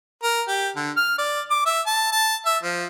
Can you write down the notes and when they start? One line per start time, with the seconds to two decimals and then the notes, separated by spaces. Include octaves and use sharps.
0.23 A#4
0.48 G4
0.76 D3
0.97 F6
1.18 D5
1.51 D6
1.66 E5
1.86 A5
2.12 A5
2.46 E5
2.63 F3